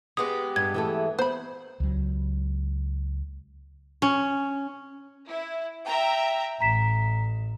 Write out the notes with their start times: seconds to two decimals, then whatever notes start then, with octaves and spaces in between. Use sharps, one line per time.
0.17 G#3 B3 G4 D#6
0.56 G2 G#6
0.74 E3 A3 A4
1.19 B3 C5 B5
1.80 C#2 F#3
4.02 C#4
5.28 E4
5.86 E5 G5 A#5
6.61 A1 A#5 B6 E7